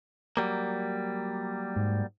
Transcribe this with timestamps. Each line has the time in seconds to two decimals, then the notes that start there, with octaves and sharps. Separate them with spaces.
0.37 F#3 G3 A#3
1.76 G#2